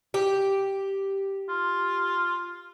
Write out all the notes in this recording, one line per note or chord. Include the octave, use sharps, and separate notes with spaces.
G4
F4